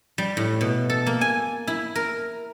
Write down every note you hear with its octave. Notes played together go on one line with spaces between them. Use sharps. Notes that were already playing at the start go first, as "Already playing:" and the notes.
G3
A2
B2
A4
A#3
G#5
E4
A#4